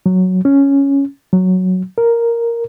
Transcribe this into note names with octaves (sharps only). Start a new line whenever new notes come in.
F#3
C#4
F#3
A#4